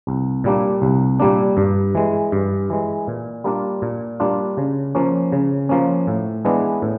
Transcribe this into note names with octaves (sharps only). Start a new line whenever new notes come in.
C2
A#2 G3 A#3 D4
C2
A#2 G3 A#3 D4
G2
E3 G#3
G2
E3 G#3
A#2
G3 A#3 D4 F4
A#2
G3 A#3 D4 F4
C#3
F3 A#3 C#4
C#3
F3 A#3 C#4
A2
E3 G#3 B3 D4
A2